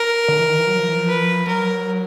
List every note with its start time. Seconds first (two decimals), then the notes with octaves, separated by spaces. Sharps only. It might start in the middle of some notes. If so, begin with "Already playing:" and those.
Already playing: A#4
0.28 D3
0.39 E3
0.48 D#3
0.58 E3
0.67 F#3
0.78 F3
0.88 E3
0.97 F3
1.08 B4
1.47 F#3 A#4